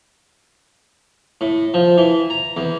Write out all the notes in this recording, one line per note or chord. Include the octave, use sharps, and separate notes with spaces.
A2
F3
E3
A#5
E2